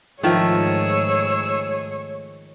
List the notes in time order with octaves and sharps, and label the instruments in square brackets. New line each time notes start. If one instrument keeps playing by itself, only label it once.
[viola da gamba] G#2 G#4 [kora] D#3 F3 A3 [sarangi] C#5 [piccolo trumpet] E6